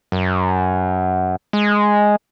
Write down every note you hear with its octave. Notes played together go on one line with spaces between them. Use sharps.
F#2
G#3